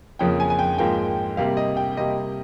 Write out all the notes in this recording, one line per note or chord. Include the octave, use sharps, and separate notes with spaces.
F2 C#3 F3 A#3 G5
G#5
G#5
G5
G#2 F3 A#3 G5
C3 G3 A#3 F5
D#5
G5
C3 G3 A#3 D#5